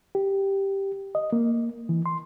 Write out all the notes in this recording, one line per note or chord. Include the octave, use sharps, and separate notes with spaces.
G4
D#5
A#3
E3
C6